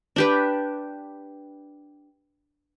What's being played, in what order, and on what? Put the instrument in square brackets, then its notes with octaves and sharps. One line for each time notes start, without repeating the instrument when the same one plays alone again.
[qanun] D4 G4 B4